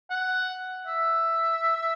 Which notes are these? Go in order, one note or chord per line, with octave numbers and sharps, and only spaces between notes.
F#5
E5